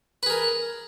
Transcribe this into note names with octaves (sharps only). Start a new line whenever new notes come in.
G#4 A#4 B4